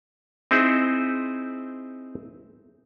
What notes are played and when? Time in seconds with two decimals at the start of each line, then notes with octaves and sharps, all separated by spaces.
0.51 C4 D#4 E4 G#4 C5